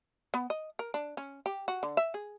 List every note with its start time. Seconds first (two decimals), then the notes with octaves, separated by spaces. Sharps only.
0.34 B3
0.50 D#5
0.79 A#4
0.94 D4
1.17 C#4
1.46 G4
1.68 F#4
1.83 D3
1.97 E5
2.14 G#4